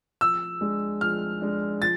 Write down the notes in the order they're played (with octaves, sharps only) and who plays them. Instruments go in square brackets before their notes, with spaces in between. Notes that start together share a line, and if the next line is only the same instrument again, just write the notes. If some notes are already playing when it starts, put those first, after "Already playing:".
[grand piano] F3 [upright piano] E6
[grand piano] G#3 D4
[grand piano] F3 [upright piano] F6
[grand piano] G#3 D4
[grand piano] F3 [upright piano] A6